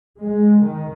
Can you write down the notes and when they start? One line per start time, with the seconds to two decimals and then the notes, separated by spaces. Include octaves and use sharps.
0.21 G#3
0.62 D#3